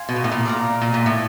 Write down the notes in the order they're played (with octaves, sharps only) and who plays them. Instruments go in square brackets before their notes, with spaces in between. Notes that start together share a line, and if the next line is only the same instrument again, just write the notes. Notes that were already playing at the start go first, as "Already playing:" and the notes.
Already playing: [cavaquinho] F5 G#5 C6
[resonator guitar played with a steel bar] B2
A#2
A2
A#2
[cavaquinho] D5 F5 A#5
[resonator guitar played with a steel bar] A#2
A#2
A2